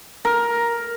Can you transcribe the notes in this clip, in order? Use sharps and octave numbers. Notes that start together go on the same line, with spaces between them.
A#4